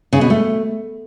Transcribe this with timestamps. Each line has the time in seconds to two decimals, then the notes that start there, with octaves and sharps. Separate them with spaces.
0.13 C#3
0.21 B2
0.30 A3